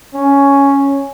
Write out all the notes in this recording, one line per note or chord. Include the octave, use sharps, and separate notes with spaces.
C#4